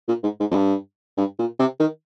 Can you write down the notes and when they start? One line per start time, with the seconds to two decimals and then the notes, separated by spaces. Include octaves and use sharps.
0.08 A#2
0.23 G#2
0.40 G#2
0.51 F2
0.55 G2
1.18 G2
1.39 A#2
1.60 C3
1.80 D#3